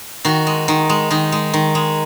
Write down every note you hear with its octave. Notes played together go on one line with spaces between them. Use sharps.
D#3 F#4
G#3
D#3
G#3
D#3 D#4
G#3
D#3
G#3